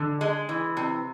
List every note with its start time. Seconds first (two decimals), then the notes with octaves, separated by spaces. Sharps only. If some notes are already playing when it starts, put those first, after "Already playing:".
Already playing: D3
0.21 G#3
0.49 E3
0.77 C3